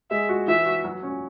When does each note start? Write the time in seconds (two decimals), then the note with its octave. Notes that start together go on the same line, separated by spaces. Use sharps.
0.10 G#3 E5
0.29 F#4
0.47 E3 E5
0.66 F#4
0.84 F#3
1.03 C#4